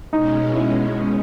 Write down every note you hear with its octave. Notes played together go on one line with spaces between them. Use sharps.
B2 G#3 C#4 D#4
E4